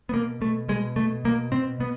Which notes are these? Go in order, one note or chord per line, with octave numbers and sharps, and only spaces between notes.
B3
B2 A#3
B2 A3
B2 G#3
B2 A3
B2 A#3
B2 C4
B2 B3